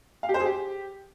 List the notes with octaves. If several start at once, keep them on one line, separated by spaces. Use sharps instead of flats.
F5
G4
C5
G#4
G4